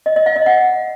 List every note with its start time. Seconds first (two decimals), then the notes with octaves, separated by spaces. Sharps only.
0.06 D#5
0.16 D#5
0.26 F5
0.36 D#5
0.46 F#5